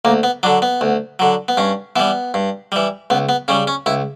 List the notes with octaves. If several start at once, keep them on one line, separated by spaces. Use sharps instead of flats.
D2 A#3
B3
D3 F#3 D4
B3
D2
D3 F#3
B3
G2 C#4
E3 G3 B3
G2
E3 G3
C#2 B3
B3
C#3 G3 C#4
C#4
C#2 E4